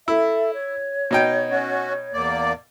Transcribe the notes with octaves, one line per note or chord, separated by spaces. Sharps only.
E4 A4 E5
C#5
B2 D#4 G5
C#4 F#4
E2 A#3 D5